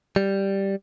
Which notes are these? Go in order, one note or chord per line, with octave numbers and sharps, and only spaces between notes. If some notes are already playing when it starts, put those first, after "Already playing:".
G3